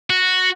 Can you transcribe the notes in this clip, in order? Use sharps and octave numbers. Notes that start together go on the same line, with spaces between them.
F#4